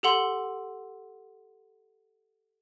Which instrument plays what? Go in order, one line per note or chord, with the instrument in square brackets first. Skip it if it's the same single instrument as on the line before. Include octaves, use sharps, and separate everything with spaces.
[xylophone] G4 A4 F#5 C6